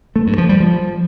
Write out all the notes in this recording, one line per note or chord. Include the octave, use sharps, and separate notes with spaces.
A3
G2
F3
G3
F3